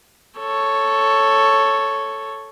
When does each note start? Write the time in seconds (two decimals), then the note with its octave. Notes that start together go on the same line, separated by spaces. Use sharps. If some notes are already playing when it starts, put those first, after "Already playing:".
0.39 A4 C#5